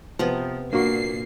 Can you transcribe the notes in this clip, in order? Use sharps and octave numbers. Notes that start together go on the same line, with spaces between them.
C3 F3 B3 A#5
A#2 A#3 D4 F#4 C#6 C7